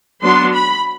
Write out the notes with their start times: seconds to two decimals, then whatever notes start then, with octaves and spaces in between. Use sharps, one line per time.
0.23 F#3 B3 D4 C6
0.54 B5